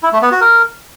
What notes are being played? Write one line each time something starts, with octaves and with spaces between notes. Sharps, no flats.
E4
A3
B3
F#4
A#4